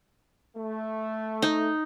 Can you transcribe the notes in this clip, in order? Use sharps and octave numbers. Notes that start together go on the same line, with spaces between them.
A3
D#4